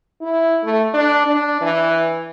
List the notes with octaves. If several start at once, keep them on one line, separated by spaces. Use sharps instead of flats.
E4
A3
D4
D4
E3